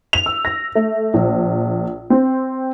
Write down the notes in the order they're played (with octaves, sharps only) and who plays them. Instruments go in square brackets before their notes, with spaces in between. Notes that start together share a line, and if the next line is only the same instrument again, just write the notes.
[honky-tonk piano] F7
E6
A#6
A3
A#1
C4